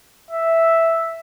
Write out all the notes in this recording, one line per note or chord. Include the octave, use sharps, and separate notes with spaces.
E5